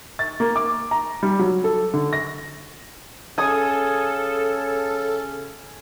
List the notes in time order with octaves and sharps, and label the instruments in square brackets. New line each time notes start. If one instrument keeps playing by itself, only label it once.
[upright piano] A6
A#3
D6
A#5
G3
F#3
A4
D3
A#6
[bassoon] C#3 [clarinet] C#4 [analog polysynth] A4 [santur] G#5 D#6